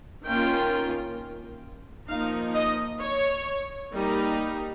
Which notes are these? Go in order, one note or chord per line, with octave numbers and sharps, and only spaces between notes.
D#3 A#3 C#4 F4 G5
F3 A#3 D#4 F5
D#5
C#5
G3 A#3 D#4